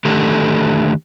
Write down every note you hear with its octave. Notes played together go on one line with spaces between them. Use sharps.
D3 D#3 A3 G4 A4